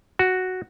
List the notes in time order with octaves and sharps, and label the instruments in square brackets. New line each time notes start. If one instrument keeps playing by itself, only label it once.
[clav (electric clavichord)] F#4